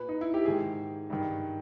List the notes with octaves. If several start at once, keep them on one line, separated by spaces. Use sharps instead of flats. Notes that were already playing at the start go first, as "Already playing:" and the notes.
Already playing: A#2 B4
D#4
E4
G4
G#2 D#3 G#4
G2 D#3